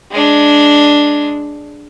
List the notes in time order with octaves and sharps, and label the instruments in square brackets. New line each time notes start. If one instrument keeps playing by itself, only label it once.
[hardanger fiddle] G#3 D4